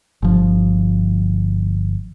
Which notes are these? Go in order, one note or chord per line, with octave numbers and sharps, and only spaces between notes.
G1 F3